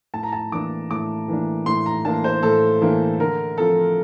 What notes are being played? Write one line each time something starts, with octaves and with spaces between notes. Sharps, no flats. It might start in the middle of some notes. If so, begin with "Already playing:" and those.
A2 A5
A#5
A5
E3 A#3 D4 D6
A2 D6
E3 A#3 D4
A2 C6
A#5
E3 A#3 D4 A5
C5
A2 A4
E3 A#3 D4
D3 A#4
F3 C4 A4